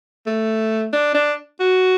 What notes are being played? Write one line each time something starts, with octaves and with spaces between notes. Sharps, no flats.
A3
D4
D4
F#4